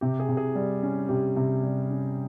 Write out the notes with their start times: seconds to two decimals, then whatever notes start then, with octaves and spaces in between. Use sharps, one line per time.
0.01 C3 G4
0.20 G#4
0.29 C3
0.37 G#4
0.55 G3
0.83 C#4
1.09 C3 G4
1.36 C3
1.63 G3
1.90 C#4